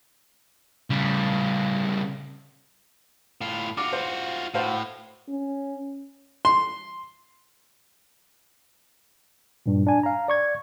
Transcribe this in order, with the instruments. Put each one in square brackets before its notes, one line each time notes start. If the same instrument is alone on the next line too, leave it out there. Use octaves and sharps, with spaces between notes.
[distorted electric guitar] C#3 G3
A2 F4
[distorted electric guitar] F4 F#4 [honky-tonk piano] D6
[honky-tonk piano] C5
[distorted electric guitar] A2 [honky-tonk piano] F#4 C5 F5
[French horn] C#4
[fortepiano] C6
[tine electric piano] G2 A#2
D4 G#5
F5 A#5
D5 C#6 G#6